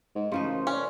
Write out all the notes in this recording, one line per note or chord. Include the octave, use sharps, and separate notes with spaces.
G#2
A1 C#3 F3 D#4 C5
A#4
C#4 C5 D5